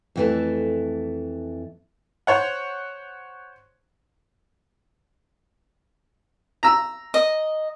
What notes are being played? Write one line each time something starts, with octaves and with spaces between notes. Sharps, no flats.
F2 E3 A3
C5 C#5 F#5
A#5 E6
D#5